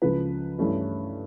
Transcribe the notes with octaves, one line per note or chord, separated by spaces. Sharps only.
C#2 C#3 F3 B4
G2 E3 A3 C#4 E4